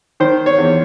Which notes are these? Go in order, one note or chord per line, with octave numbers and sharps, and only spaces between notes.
D#3 C5
C#5
E2